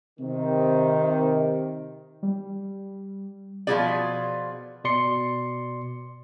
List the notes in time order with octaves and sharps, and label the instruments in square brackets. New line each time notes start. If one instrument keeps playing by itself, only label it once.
[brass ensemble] C3 D#3
[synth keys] G3
[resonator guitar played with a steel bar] B2 F3 G#3 F4 G#4 D5
[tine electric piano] B2 D5 C6 C#7